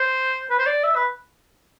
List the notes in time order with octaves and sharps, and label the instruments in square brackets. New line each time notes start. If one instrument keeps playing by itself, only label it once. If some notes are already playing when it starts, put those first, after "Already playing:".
Already playing: [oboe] C5
B4
C5
D5
E5
B4